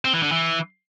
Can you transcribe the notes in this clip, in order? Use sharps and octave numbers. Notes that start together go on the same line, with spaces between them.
C4
E3
D3
E3